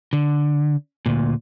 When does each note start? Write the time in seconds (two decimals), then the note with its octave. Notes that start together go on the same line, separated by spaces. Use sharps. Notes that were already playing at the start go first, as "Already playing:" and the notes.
0.13 D3
1.06 D2 A#2